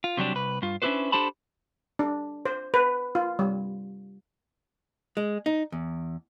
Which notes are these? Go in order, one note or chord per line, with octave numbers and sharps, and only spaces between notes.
F4
C3 F#3 G3 D4
C2 B4
G2 F4
C#4 D4 E4 G4 B4 C5
D4 G4 A4 C5 A5 B5
D4
C5
B4
F4
G3
G#3
D#4
E2